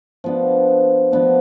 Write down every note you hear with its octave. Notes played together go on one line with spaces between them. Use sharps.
F3 B3 D4
F3 B3 D4